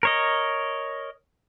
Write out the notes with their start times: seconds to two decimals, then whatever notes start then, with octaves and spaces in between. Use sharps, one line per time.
0.03 A#4 C#5 D#5